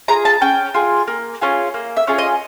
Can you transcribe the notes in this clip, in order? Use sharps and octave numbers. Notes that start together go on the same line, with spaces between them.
F4 G#4 A#5
A5
C#4 G5
F4 G#4
A#3
C#4 F4 G#4
A#3
E5
C#4 F4 G#4
D#5